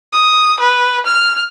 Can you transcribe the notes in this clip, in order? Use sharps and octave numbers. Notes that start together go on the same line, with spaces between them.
D#6
B4
F6